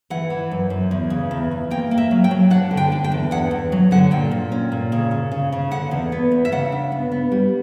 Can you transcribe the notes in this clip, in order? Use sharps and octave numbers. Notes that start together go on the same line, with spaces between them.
E3 F#5
E3
F#2
F#2
E2
C#3
E2
E2
A#3 G5
A#3
E5
F#3
G5
F#3
D4 F#5
D3
G5
D4
G5
E2
E2 F#5
E2
F#3
D3 F#5
A#2 G5
A#2
C#4
A#2
C#3
C#3
C#3
C#3
D3 F#5
E2
B3
E2
E5
C#3 F#5
D4
B3
B3
G3